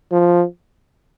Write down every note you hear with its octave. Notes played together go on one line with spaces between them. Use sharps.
F3